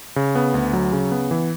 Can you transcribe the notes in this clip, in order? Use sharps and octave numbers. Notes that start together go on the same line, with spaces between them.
C#3
B3
D2
F#3
C#3
B3
E3